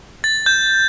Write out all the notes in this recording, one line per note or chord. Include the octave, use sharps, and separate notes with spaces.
A6
G6